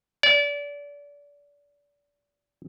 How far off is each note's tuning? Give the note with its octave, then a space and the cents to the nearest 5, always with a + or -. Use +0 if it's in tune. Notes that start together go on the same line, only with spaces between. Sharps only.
D5 -30